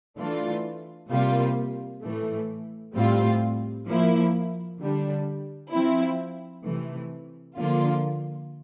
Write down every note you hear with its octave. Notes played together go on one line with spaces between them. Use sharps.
E3 A3 D4 F4
C3 G3 A#3 F4
A2 E3 A3
A2 G3 C4 F4
F3 A#3 E4
D3 G3 D4
F3 C4 E4
C3 E3 A3
D3 F3 A#3 F4